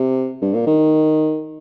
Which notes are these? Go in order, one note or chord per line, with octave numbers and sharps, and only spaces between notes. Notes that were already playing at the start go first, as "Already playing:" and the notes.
Already playing: C3
G2
A#2
D#3